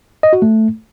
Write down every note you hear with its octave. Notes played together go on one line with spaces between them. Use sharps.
D#5
F#4
A3